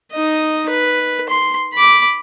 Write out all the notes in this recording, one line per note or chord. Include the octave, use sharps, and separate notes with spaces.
D#4 D#5
B4
C6
B5 D6